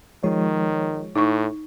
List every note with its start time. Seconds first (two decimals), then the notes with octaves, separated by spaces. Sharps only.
0.24 D#3 F3 G#3 C#5
1.16 A2 D#4 C#6